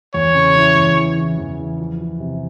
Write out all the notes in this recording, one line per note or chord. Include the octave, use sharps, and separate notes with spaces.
E2 C#5
C#3
E3
E2
E3
E3
E2
E3
F3
F3
C3